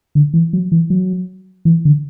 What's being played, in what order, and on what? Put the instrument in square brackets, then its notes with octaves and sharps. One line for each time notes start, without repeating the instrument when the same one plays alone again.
[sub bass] D3
E3
F#3
E3
F#3
E3
D3